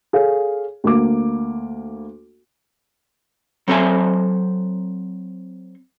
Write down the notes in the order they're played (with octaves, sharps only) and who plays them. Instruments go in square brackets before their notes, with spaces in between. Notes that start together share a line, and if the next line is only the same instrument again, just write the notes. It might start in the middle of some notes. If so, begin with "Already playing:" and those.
[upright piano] G#4 A4 C#5 F5
D2 A#3 D6
[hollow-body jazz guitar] F#3 C4 A4 C5 E5 G#5